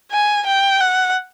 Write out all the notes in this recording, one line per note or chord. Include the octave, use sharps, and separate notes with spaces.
G#5
G5
F#5